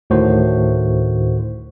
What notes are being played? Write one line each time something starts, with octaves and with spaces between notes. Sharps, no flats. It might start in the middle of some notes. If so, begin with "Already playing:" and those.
D2 A2 D#3 F#4 C5